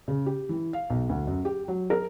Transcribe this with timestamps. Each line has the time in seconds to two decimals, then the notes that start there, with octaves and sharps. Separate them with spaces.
0.08 C#3
0.26 G4
0.49 E3
0.73 F5
0.90 B1
1.09 D2
1.27 F#2
1.45 G4
1.68 F#3
1.90 A#4